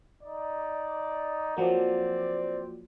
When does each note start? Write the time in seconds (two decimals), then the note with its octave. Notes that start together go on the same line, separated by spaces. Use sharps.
0.23 D#4 D5
1.57 F3 F#3 A#3 C4 D5